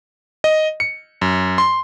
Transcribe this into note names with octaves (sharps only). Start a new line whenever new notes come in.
D#5
C#7
F#2
C6